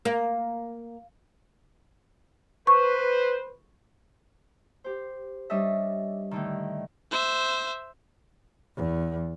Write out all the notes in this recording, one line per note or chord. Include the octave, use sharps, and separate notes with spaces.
A#3
B4 C5 C#6
G4 C5
G3 C#4 D4 C#5 D#5 E5
A2 D3 D#3
C5 E5
E2